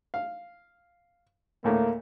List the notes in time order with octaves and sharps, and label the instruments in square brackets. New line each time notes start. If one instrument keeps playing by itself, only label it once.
[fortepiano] F5
[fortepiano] D2 A2 A3 [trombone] A#3